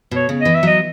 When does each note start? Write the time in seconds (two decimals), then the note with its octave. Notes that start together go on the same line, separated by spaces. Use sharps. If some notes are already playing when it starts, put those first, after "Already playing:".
0.11 B2 C#5
0.29 C#3
0.41 E3 D#5
0.55 E5
0.63 F#3 D#5